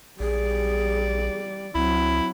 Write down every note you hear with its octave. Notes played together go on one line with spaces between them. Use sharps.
A#1 G3 G#4 D5
C#2 F#3 C4 E4